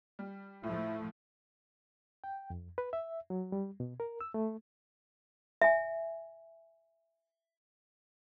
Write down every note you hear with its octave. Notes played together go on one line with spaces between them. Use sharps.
G3
A2 F3 A3 E4
G5
F2
B4
E5
F#3
G3
B2
A#4
E6
A3
E5 G#5